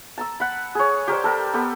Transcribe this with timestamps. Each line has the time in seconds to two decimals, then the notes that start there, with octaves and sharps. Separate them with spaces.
0.18 A5 A#5 E6
0.40 F#5 B5
0.75 G#4 C#5
1.08 G4 A#4 C5 D5
1.24 A4 A#4 G5
1.54 B3 G4 A4 B5